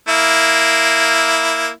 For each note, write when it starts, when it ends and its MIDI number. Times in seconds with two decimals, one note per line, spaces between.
0.08 1.69 58
0.08 1.69 64